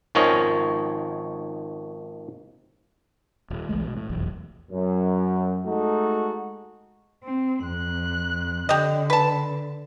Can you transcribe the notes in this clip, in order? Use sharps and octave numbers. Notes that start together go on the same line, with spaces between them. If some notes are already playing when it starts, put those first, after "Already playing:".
G#1 D#3 F3 C#4 C#5 D#5
D#1
B1 E3 G#3 A3
B2
A2
F1 B1 E2
F#2
G#3 A3 D#4 F#4 A4
C4
F2 F#6
D3 G4 D#5
B4 A5